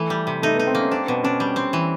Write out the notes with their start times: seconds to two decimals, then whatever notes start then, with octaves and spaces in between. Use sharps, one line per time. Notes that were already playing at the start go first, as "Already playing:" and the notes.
Already playing: E3 A3
0.10 G3
0.27 C3
0.42 A3 D#4
0.55 B3
0.59 D#4
0.67 C4
0.75 A#3
0.80 C#4
0.91 C4 D4
1.07 B2 B3
1.24 C#4 D4
1.40 G3
1.56 C4
1.73 E3